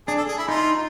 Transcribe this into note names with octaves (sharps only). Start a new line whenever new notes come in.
D4 G#4
A4
G#4
E4
D#4 F4